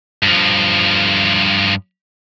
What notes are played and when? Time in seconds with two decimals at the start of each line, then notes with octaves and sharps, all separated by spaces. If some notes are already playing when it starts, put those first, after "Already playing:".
0.23 G2 F3